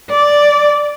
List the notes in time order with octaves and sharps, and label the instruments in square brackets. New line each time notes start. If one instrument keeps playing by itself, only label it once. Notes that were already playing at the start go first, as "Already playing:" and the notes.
[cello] D5